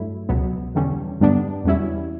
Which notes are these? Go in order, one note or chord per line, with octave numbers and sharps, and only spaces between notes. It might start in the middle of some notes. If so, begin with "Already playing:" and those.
Already playing: G2 F#3 A3 E4
C#2 B2 F#3 B3
E2 D3 G3 C#4
G2 D3 G3 B3 D4
E2 B2 G3 C#4 E4